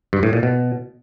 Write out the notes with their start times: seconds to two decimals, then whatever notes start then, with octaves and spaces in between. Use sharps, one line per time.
0.13 G2
0.23 A2
0.33 A#2
0.43 B2